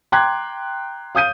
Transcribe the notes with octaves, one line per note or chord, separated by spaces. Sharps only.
G5 A#5 C6 D6 F#6 G#6
F5 D#6 G6 D#7